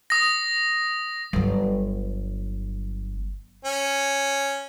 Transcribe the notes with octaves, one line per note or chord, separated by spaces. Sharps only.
D#6 A#6
G1 F#3
C#4